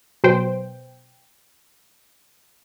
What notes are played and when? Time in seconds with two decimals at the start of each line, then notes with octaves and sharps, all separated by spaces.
0.24 B2 F#3 C5 G5